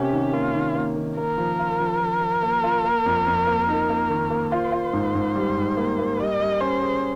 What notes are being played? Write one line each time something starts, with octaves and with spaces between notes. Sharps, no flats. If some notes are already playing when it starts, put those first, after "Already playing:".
Already playing: C3 A#3 C#4 G4
D#3
A#3 F4
D#3
A#3
D#3
A#3 A#4
F3
F4
F3
F3
F3
A#3
F4
A#3
F2
F2
A#3
D#4
A#3
D#3
A#3
F4 C5
F4
G#2
G#2
G3
G#2
A#3
A#3
G3 D#5
G3
C#4 C5
G#4